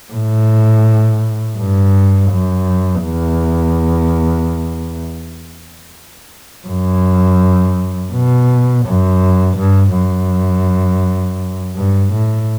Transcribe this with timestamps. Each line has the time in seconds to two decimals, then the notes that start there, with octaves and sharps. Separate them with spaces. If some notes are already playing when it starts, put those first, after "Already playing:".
0.13 A2
1.58 G2
2.31 F#2
3.03 E2
6.67 F#2
8.12 B2
8.85 F#2
9.57 G2
9.94 F#2
11.76 G2
12.12 A2